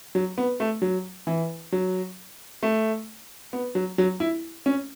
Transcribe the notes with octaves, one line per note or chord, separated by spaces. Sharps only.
F#3
B3
A3
F#3
E3
F#3
A3
B3
F#3
F#3
E4
C#4